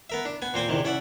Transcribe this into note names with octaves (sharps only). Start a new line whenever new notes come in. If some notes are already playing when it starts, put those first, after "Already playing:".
B3 A#4 E5
D4
B3 G#5
A#2 C4 C5 G#5
E2 C3 D#3
C#4 D5 E5 F#5